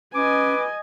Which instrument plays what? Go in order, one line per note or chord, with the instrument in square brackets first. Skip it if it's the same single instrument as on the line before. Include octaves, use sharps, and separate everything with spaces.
[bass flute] C#4 [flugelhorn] B4 [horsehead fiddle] D#5 G#5 [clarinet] D6